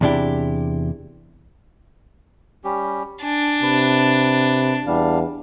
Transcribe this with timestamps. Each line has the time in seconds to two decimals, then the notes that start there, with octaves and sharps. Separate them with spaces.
0.01 E2 C3 D4 E4 G4
2.64 G3 C#4 G4
3.23 D4 G#5
3.62 C3 B4
4.87 E2 G3 D4 F5